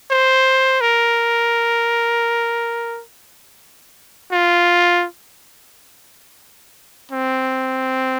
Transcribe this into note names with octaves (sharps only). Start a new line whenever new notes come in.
C5
A#4
F4
C4